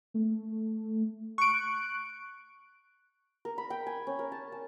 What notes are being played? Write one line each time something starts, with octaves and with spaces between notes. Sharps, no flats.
A3
C#6 F#6 D7
A#4
B5
G5
G#5
C#4
A#4
A5
A5